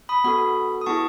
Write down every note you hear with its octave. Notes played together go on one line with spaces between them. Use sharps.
B5 D#6
B3 F#4 A4 B5 D#6
D#6
B3 E4 G#4 A5 C#6